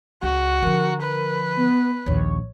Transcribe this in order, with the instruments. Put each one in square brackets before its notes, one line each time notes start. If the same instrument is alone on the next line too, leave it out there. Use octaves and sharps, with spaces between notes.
[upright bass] C#2 [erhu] F#4
[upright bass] D3 F3 [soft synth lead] A#4
[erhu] B4
[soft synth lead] B3
[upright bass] A#1 D#2 [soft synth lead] C#5